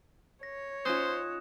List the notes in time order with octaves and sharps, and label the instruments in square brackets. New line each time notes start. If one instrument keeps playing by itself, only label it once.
[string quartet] C#5 [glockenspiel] A#6
[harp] C#4 D#4 F4 [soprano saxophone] C5 [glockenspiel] D#6 F#6 E7